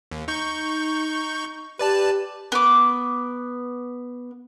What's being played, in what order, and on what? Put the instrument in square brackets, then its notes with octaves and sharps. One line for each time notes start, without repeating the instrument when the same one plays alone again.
[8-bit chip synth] D#2
D#4 C#6 G6
[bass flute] G4 [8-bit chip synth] B4 D5 A5
[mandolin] B3 D6